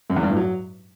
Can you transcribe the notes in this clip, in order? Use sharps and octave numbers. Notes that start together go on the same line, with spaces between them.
F#2
E2
G2
A2
F#3